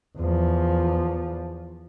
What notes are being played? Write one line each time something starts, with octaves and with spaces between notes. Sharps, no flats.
E2 F3